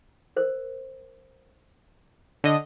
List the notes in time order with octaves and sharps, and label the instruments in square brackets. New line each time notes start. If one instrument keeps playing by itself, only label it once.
[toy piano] A#4 C5
[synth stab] D3 D#5